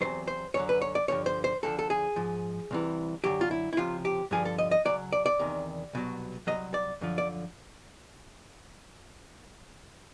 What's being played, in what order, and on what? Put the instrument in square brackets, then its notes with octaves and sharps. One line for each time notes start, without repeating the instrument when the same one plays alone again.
[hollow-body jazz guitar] E2 C3 D#3 F#3 C5
C5
F#2 D3 F#3 C#5
B4
C#5
D5
G2 D3 F3 C#5
C5
C5
D2 D3 F3 A4
A4
G#4
G#2 F3
C2 C3 E3
F#2 D3 F#3 G4
F4
E4
E4
C#2 C3 F3 F4
G4
G2 D3 F3 G#4
A4
D#5
D#5
C#2 C#3 F#3 D5
D5
D5
E2 C3 D#3
C2 B2 F#3
C2 B2 F#3 D#5
D5
F#2 D3 F3
D5